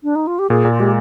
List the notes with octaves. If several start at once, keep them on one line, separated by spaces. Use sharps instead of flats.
D4
D#4
F4
G4
A#2 G#4
A#2
F4
G#3 G4